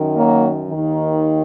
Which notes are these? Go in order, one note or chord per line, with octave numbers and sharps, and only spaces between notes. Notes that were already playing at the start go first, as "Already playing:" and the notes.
Already playing: F#2 D#3
F#3 A#3
D#2 D#3